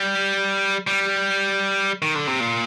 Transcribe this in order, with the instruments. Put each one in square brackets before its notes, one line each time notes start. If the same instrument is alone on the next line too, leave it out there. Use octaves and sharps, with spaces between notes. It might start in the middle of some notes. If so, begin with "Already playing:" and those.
Already playing: [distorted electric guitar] G3
G3
D#3
D3
C3
A#2